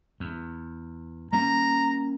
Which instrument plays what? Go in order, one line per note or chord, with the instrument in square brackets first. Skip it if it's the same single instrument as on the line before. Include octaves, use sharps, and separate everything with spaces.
[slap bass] E2
[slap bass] G3 A#3 C#4 [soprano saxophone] A#5